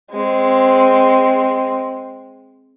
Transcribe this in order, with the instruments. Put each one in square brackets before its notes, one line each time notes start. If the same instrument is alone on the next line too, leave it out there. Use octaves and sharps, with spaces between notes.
[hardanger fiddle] G#3 C4